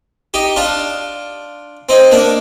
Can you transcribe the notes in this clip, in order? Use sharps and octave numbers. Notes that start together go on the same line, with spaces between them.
D#4 G4
D4 F4
C4 D#4
A#3 D4